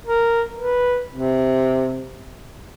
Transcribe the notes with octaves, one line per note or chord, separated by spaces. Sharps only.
A#4
B4
C3